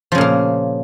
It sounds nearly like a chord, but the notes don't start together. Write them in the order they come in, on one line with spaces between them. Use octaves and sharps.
F3 C#3 A#2 A#3